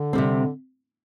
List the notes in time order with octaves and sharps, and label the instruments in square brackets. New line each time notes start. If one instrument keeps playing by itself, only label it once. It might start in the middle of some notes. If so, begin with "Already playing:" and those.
Already playing: [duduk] D3
[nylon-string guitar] C3 G3 C4